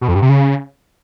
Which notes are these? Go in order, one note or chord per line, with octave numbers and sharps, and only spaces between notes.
B2
F2
G2
C3
C#3